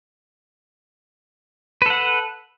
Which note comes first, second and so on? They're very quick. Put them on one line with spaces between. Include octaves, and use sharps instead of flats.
B4 A4 F#5